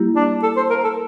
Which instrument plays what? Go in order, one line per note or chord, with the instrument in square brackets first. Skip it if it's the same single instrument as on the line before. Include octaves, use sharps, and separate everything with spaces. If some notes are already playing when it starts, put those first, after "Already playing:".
Already playing: [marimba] G3 A#3 E4 G4
[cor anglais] D4
A4
C5
A#4
A4